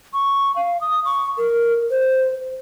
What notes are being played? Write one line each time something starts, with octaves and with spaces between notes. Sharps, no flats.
C#6
F5
D#6
C#6
A#4
C5